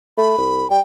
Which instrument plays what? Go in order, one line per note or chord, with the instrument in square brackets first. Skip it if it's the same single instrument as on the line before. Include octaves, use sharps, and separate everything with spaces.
[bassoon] A3 [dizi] B5
[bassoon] C2
[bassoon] G3 [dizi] G5